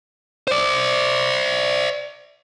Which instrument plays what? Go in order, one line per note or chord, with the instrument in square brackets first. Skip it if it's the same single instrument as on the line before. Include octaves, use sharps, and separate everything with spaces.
[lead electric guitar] C5 D5